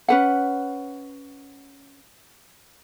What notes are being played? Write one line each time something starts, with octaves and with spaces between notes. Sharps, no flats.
C#4 B4 F#5